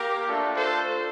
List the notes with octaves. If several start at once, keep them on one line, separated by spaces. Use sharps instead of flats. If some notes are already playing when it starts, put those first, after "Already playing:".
Already playing: A#3 G4 A#4
A3 D4 F4 A4
A4 C5